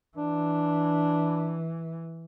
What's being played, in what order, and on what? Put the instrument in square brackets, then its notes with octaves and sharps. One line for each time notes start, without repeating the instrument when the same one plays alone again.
[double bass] E3 [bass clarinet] D4